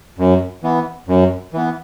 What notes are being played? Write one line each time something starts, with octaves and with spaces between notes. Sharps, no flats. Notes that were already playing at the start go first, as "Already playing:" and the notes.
F#2
E3 B3
F#2
E3 B3